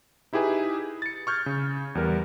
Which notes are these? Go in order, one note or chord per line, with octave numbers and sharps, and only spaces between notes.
D#4 E4 G4 G#4 B4 G#5
A6 C#7
C#6 F6 G6 G#6
C#3
E2 G3 A#4